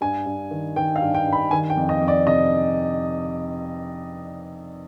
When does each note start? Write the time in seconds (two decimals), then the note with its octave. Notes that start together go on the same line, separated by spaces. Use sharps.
0.01 G2 G#5
0.26 G2
0.51 D#3
0.76 D#3 G5
0.96 F5
1.02 G2
1.14 G5
1.27 G2
1.32 B5
1.51 D#3 G#5
1.70 G5
1.77 F2
1.89 D#5
2.01 F2
2.08 D5
2.27 C3 D#5